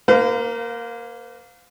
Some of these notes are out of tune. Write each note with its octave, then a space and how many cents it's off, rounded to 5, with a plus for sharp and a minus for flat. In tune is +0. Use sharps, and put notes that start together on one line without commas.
A#3 +0 C5 -45 F5 +25